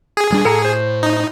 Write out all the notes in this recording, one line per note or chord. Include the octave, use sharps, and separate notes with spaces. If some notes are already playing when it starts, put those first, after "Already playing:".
G#4
D#1 G3 D4
A2 A4 F#5 A#5
C5
D#4